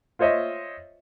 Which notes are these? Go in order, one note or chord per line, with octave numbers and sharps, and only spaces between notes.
F4 C5 C#5 D#5 E5